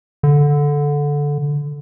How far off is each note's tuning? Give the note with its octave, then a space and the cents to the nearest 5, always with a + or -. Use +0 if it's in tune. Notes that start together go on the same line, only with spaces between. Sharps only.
D3 -10